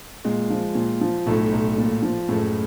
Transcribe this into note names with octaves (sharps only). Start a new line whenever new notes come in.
A#2 G#3
F3
A#2
F3
B1 A2 A3
B1
A#2
F3
F#1 A2 A3